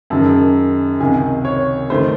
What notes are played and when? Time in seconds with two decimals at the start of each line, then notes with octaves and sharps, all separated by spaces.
0.10 F#2 D#3 G#3 A5
1.00 C#2 C3 D#3 G#5
1.45 C#5
1.90 D#3 A3 C5